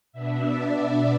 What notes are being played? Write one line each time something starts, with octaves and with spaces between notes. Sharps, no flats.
B2 B3 D4 E5
D5